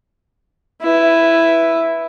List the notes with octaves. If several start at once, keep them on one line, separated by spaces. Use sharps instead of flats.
E4 B4